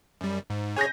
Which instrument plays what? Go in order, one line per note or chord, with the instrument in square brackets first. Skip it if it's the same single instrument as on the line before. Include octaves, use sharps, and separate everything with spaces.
[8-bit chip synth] F#2 G3
G#2
[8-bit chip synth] G#4 C#5 [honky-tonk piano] G#5 G6 A#6